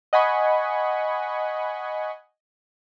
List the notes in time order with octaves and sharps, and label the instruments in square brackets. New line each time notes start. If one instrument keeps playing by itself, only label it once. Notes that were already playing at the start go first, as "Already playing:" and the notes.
[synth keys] D#5 F#5 G#5 B5 C#6